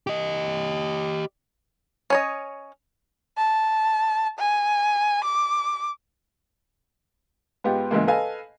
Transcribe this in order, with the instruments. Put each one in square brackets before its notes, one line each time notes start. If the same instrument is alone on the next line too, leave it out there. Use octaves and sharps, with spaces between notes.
[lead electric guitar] G4 D#5
[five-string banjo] C#4 C#5 D#5
[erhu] A5
G#5
D6
[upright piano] G#2 B3 F4 G4
C#2 G#2 E3 A#3
A4 B4 D#5 F5 G#5